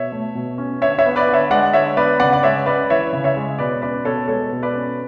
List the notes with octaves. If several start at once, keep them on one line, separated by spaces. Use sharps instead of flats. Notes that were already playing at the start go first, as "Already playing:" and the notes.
Already playing: B2 C#5 E5
A3
B2
C#4
D3 C#5 E5
C#5 E5
B3
B4 D5
D3
C#5 E5
G#3 D5 F#5
D3 C#5 E5
B3 B4 D5
C#3 D5 F#5
D5
G#3 C#5 E5
C#4 B4 D5
E3 C#5 E5
C#3
C#5 E5
G#3
B2 B4 D5
C#4 B4 D5
B2 A4 C#5
G#3 A4 C#5
B2
B4 D5
C#4